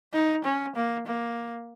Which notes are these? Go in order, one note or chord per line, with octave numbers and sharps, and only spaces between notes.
D#4
C#4
A#3
A#3